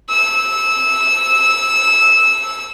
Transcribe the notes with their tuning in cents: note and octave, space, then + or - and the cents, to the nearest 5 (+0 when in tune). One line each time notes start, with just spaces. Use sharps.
E6 -15